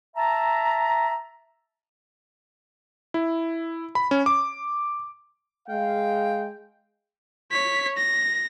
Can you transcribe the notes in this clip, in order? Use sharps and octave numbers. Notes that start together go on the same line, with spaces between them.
E5 A5 A#5
E4
B5
C#4
D6
G#3 F5 G5
C#5 B6
A#6